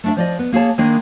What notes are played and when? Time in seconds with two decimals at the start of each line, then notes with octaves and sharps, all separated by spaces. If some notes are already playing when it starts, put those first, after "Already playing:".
0.04 A3 D4 E5
0.16 F3 D5 D#5
0.39 B3
0.52 A#3 G#4 C#5 A5
0.78 D#3 G#3 A#3 D4 D#5